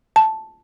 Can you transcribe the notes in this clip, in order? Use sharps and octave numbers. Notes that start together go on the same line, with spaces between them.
A5